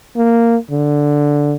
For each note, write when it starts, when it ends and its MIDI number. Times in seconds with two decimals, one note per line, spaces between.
0.16 0.56 58
0.70 1.56 50